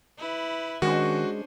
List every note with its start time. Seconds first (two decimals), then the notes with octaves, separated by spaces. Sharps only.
0.18 E4 B4
0.82 D#3 G#3 C#4 D4 F#4 C5